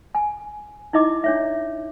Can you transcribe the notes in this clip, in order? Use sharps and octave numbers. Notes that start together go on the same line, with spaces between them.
G#5
D#4 E4 D#5 D6
D4 C#5 E5